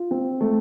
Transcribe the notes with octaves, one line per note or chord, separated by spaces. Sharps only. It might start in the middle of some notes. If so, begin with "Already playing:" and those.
Already playing: F4
C4
A3